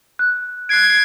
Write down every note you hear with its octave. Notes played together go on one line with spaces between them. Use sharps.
F#6
F#6 G#6 C7 D7
C7